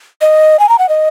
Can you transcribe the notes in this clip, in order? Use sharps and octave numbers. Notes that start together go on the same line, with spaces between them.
D#5
G#5
A#5
F#5
D#5